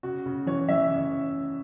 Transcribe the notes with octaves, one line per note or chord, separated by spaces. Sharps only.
C#3 F#4
C#3
E3 C#5
E3 E5
C#3